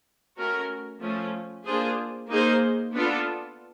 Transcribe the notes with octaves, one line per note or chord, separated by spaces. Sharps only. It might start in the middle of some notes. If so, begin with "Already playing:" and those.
A3 C#4 F#4 A#4
F3 A3 C#4
A#3 D4 F4 G#4 C5
A#3 D#4 G#4 C5
B3 D4 F4 A4